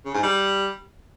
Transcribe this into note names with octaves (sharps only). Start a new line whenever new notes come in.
C#3
G#2
G3